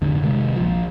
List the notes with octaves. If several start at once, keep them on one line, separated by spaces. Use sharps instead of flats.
F2 G#2 D3
C3 D#3 G#3
A#1 F3